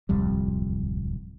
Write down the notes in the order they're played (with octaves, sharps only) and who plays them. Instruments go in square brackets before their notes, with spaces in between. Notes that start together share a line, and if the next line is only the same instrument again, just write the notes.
[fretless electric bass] D1 C2 F2 G3